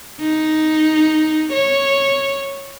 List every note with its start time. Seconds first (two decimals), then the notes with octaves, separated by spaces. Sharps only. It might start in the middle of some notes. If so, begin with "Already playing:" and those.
0.20 D#4
1.52 C#5